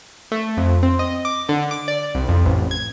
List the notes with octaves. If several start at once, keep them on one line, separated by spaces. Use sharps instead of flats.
A3
F2
C4
D#5
D6
D3
D6
D5
C2
F2
A1
G#6